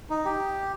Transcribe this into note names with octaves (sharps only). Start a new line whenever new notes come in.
D#4
G4